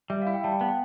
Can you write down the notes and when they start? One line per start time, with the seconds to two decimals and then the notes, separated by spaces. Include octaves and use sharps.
0.10 G3 E5
0.22 E4 F5
0.33 G5
0.44 G3 A5
0.52 G5
0.60 B3 A5
0.68 G5